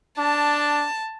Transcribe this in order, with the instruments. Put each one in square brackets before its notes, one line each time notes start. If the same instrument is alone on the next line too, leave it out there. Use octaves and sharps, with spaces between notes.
[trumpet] D4 [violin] A5